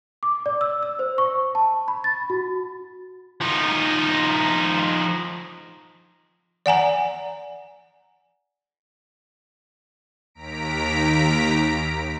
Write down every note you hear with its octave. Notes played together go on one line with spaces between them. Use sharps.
D6
D5
E6
E6
C5
C#6
A5
B5
A6
F#4
F3 D#4
D5 F#5 G#5 A#5
D#2 A#5 B6 D7